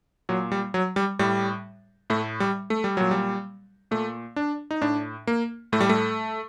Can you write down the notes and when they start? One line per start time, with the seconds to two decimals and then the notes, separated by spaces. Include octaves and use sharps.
0.29 A#2 F#3
0.52 G3
0.74 F#3
0.96 G3
1.19 A2 G3
2.10 A2 A3
2.40 G3
2.70 A3
2.84 G3
2.97 A#2 F#3
3.11 G3
3.91 A#2 A3
4.36 D4
4.71 D#4
4.82 A2 D4
5.27 A#3
5.72 A2 A3
5.81 G3
5.89 A3